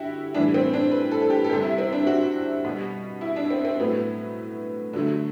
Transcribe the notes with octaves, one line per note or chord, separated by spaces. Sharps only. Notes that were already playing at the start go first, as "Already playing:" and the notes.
Already playing: D3 E4 F#4 G4
A2 E3 G3 D4
C4
D4
B4
A4
A4
G4
A4
C3 G3 G4
E4
C4
D4
F#4
B2 G3
E4
D4
C4
C4
A2 F#3 A3 B3
D3 F#3 A3